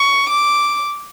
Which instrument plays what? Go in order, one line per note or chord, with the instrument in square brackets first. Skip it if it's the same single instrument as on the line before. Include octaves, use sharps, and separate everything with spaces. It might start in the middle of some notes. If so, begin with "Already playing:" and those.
Already playing: [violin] C#6
D6